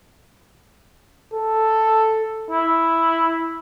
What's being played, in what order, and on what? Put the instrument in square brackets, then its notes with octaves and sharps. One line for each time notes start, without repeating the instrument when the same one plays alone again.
[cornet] A4
[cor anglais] E4